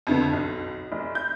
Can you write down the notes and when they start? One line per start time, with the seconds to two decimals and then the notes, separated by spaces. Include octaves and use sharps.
0.07 F2 D3 B3
0.33 B1
0.92 F1
1.15 G6